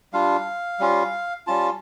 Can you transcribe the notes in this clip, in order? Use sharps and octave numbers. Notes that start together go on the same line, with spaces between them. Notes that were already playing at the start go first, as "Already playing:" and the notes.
G3 D4 F4 F5
G3 C#4 F4
G3 C#4 F4 A5